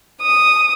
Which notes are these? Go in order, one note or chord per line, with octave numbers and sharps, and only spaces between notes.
D#6